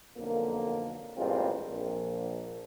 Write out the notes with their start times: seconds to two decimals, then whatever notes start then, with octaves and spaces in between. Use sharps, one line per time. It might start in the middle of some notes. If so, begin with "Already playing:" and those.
0.17 B1 F2 D3 A#3
1.17 A1 G2 A#2 G#3 C4 F4
1.70 A#1